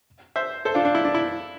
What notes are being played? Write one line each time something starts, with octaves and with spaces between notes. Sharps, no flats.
C5 E5
A4 C5
D4 F4
D4
E4
D4
E4